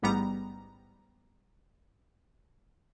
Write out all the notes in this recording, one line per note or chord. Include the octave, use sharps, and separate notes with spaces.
A1 G#2 G3 B3 A#5